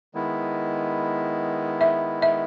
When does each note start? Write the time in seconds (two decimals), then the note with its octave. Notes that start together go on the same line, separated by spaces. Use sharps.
0.14 D#3 G#3 B3 E4
1.81 E5
2.22 E5